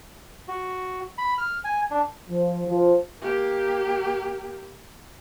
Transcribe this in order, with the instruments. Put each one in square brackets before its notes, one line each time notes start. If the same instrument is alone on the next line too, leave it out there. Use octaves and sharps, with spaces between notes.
[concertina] F#4
B5
F6
G#5
D4
[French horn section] F3
F3
[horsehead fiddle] A#3 G4